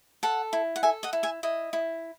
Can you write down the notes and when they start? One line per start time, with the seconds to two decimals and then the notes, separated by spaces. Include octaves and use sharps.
0.23 A4 F#5 A5
0.53 E4
0.76 F#5
0.83 A4 E5 G#5
1.03 D#5 F#5
1.13 E4
1.23 E5 G#5
1.43 E4 D#5
1.73 E4